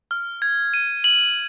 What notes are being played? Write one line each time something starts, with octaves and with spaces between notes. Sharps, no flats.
F6
G#6
D#7
F#7